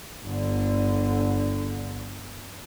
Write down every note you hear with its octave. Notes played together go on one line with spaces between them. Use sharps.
G1 D3